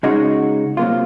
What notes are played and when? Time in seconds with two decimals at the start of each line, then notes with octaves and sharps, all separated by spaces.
0.03 C#3 G#3 D#4 F#4
0.77 C3 F#3 A#3 F4